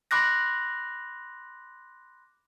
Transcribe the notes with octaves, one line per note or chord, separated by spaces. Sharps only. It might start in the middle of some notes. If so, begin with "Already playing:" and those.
B5 C6 D6 F#6 A#6